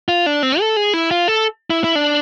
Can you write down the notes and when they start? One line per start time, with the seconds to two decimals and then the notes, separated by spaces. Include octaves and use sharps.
0.09 F4
0.26 D4
0.43 C4
0.60 A4
0.76 G#4
0.94 E4
1.11 F4
1.28 A4
1.70 E4
1.84 E4
1.95 D4